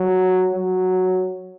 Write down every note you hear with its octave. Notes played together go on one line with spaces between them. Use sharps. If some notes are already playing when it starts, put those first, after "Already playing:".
Already playing: F#3
F#3